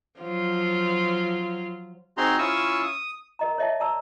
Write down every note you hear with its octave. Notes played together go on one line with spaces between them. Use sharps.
F3 F#3 F4
C4 D#4 F#4 G#4 A#5 C6
C#4 E4 F4 C#6 D#6 E6
D#6
A#4 D#5 A#5
C#5 D#5 E5 A5
D5 A5 A#5 E6